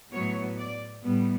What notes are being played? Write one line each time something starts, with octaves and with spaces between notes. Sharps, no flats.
A2 F#3 B3 C#5
D5
A2 G3 B3